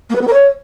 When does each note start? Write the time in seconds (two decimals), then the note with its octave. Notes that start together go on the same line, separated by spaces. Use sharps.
0.09 A#3
0.15 B4
0.21 B3
0.27 A#4
0.33 C#5